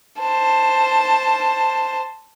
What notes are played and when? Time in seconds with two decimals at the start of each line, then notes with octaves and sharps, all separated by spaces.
0.19 C5 A5